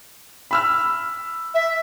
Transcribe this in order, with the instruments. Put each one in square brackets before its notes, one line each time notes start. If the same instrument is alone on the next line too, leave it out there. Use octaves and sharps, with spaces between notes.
[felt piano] B5 E6 F6
[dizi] E5